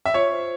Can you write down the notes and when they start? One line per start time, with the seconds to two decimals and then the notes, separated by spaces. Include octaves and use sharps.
0.05 E5
0.14 F4 C#5
0.31 C5